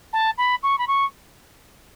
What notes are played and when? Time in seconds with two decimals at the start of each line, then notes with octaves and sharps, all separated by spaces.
0.13 A5
0.38 B5
0.63 C#6
0.78 B5
0.88 C#6